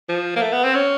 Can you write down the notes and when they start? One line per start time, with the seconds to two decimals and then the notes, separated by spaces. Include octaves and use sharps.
0.09 F3
0.36 A#3
0.42 A3
0.52 B3
0.64 C4
0.75 C#4